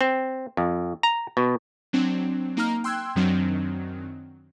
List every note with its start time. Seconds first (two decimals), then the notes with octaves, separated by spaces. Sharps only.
0.01 C4
0.57 F2
1.03 A#5
1.37 B2
1.93 F#3 C4 D4
2.57 A#3 D#4 A#5 F6
2.84 G5 C6 E6 F#6 G#6
3.15 F#2 D#3 F#3 C4 D4